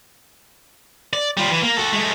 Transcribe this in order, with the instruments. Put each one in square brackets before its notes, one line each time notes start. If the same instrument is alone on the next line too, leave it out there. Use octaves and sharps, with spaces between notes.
[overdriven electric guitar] D5
G3 F4
E3
A#3
F#4 A4
G#3 A3